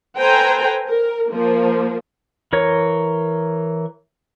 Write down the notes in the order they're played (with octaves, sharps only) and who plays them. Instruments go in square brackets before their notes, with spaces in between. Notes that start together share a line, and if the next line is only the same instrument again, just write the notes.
[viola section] A4 B4 C5 G5 G#5 A#5
A#4
F3 A#3
[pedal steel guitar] E3 A#4 C#5